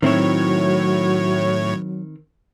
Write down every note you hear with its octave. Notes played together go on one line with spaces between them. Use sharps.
A2 D#3 F#3 C4 E4 C#5